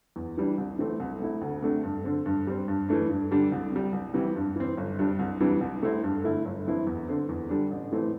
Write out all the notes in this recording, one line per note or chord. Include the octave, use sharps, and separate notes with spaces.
E2
E3 G3 D4
C2
C3 E3 A3 C4
C2
C3 A3 E4
D2
C3 A3 D4
G2
D3 C4
G2
G3 C4
G2
E3 A3 D4
G2
D3 G3 D4
C2
C3 G3
C2
C3 E3 G3
G2
E3 C4
G1
G2 G3 D4
C2
C3 E3 G3 D4
C2
C3 A3 C4 E4
G2
D3 A3 E4
G1
G2 E3 C4 E4
E2
D3 C4
E2
D3 G3 D4
A1
A2 E3 A3 C4